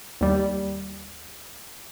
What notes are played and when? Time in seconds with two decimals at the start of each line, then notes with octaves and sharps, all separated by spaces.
0.21 D#2 G3